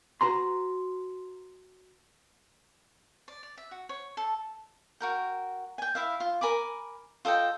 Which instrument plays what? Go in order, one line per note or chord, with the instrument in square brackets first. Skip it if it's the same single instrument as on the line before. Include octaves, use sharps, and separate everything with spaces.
[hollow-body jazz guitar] F#4 B4 A#5 C6
[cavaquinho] D5
D5
E5
F#4
C#5
A4
F#4 A#4 G5
G5 G#5
E4 E5 F5
F4
A#4 G#5 B5 D6
F4 A4 D#5 G5